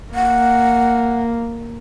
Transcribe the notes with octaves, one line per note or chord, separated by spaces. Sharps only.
A#3 F#5